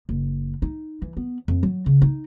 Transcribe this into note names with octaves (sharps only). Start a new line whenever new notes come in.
F#1
D#4
E3
B3
F2
F#3
C#3
D#4